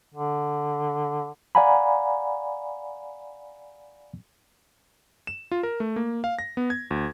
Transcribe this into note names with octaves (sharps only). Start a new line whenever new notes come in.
D3
D5 F5 F#5 G#5 A#5 B5
E7
F4
A#4
A3
A#3
F5
A#6
B3
G#6
D2